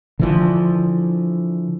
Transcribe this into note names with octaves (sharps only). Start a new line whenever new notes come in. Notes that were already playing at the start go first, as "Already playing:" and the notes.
D3 E3 F3